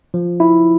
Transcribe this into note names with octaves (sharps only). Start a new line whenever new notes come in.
F3
E4